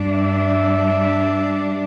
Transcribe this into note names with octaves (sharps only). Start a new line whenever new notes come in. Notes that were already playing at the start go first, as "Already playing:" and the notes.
Already playing: G2 G3 D4
E5